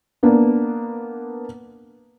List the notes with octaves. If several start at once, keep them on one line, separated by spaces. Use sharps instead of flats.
A#3 B3 D4